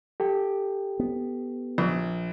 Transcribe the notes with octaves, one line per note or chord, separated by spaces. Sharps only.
G4 A4 G5
B3
A#1